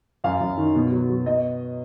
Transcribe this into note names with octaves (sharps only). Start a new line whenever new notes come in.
F#2 F5
F#2
D#3
B2
F#3
F#3
B2 D#5